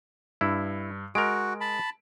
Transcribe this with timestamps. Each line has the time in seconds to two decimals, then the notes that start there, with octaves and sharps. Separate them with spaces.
0.41 G2 E4
1.15 G#3 F#4 A#4 D7
1.61 A5 B5